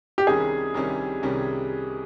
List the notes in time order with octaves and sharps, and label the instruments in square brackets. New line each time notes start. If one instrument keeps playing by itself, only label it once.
[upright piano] G4
[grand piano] C2 C3 D#3 G3 C#4 [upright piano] G#4
[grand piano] C2 C3 D#3 G3 C#4
C2 C3 D#3 G3 C#4